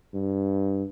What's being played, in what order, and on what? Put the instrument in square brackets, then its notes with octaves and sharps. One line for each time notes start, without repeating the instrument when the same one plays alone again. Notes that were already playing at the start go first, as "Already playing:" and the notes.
[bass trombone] G2